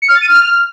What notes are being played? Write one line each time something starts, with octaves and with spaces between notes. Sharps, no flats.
C#7
F6
A6
D#7
F6